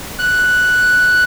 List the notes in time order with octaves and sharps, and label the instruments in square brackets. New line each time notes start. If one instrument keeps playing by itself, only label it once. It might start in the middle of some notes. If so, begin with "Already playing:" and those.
[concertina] F#6